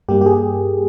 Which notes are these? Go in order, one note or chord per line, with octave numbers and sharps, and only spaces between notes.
G2 G3 A#3 G4
G4
G#4